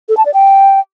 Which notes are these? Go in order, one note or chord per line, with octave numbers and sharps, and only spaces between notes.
A4
A5
D5
G5